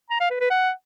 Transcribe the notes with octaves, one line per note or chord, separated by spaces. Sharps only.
A#5
F5
B4
B4
F#5